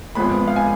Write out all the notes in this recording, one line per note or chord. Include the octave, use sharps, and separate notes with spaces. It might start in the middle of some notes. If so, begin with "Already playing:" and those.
G#1 G#2 F3 G#3 B3 B5
F5
G#5